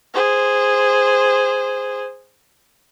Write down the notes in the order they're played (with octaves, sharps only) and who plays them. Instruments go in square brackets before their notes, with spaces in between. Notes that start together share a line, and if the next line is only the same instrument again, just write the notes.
[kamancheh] G#4 C5